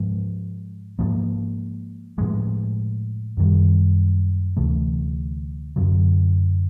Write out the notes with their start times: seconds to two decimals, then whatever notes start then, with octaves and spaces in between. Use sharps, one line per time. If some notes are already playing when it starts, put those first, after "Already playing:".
Already playing: G#2 F3 G#3
0.99 G#2 F3 A#3
2.18 A2 F3 G#3
3.37 F#2 D#3 G3
4.57 D2 C3 E3 A3
5.76 F#2 D3 F#3